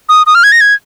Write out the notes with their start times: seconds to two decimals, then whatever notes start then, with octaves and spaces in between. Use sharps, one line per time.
0.09 D#6
0.27 D#6
0.35 F6
0.44 G#6
0.52 A#6
0.61 G#6